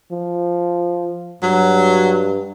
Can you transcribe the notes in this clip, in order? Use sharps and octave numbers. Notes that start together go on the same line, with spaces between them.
F3
G2 F#3